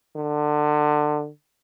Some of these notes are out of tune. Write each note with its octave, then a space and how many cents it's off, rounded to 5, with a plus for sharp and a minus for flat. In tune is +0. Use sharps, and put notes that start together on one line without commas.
D3 +25